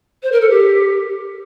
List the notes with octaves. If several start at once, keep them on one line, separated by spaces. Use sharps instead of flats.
C5
A#4
A4
G4